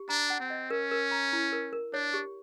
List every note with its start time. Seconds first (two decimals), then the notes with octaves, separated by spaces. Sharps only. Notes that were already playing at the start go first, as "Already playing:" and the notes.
Already playing: G4
0.09 D4 A#5
0.30 F#5
0.40 C4
0.50 D#5
0.70 C#4 A#4
0.91 A#4
1.11 A#5
1.33 E4
1.53 A#4
1.73 A#4
1.94 D4 C#5
2.14 G4